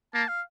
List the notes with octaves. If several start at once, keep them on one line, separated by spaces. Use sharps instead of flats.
A#3 A5
F5